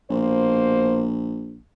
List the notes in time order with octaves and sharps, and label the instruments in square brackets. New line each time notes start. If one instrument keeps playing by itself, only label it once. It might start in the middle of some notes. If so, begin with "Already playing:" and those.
[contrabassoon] A#1 [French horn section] B2 A#3 C5